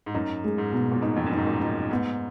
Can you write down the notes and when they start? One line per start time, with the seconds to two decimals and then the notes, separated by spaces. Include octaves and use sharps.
0.06 G#2
0.15 F#2 D#4
0.44 G#3
0.58 G#2
0.72 B2
0.92 A#2
1.02 B2 D#4
1.16 F2
1.26 F#2
1.32 G#2 D#4
1.47 A#2
1.61 D#4
1.91 G#2 B3